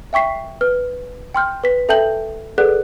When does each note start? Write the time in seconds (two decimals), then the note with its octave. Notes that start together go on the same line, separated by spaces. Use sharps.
0.13 E5 G5 C#6 B6 C7
0.61 B4 F6
1.34 G5 C6 F6 G6
1.64 B4 B6
1.89 A4 E5 G5 A5 G6 F#7
2.58 G#4 A4 B4 D5 F#5 F#6